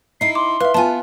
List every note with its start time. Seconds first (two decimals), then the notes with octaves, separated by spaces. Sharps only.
0.21 D#4 E4 C7
0.35 C6 D6
0.60 B4 E5 F5
0.74 B3 F4 G#5 A5